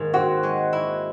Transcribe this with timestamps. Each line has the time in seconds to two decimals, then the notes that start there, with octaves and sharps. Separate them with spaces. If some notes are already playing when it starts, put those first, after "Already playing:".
Already playing: G#2 D#3 A#3
0.14 C4 F#4
0.43 G#3
0.73 E4